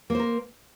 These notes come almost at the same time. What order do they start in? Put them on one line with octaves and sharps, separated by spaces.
A#3 C5 A#4